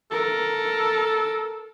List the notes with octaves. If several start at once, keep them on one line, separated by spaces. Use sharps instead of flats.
A4 A#4